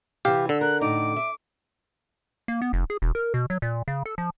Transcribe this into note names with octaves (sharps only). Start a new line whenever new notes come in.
C3 E3 G4 F5
D3 E6
A#4 F#6
A2 D#4 D6
E5
A#3
B3
F1
G#4
E1
A#4
B2
F#3
A#2
C#3
A4
F3